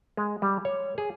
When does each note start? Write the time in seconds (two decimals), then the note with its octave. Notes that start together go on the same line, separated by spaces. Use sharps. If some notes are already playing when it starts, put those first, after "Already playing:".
0.17 G#3
0.42 G3
0.65 C#5
0.98 G#4